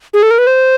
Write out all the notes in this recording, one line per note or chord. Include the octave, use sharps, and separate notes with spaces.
G#4
A4
A#4
B4
C5